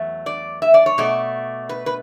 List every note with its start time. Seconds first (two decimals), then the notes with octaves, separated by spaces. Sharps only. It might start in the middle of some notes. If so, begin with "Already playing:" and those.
Already playing: E2 F#3 A3
0.26 D5
0.62 E5
0.74 D5
0.86 C#5
0.98 B2 A3 D5
1.69 B4
1.86 B4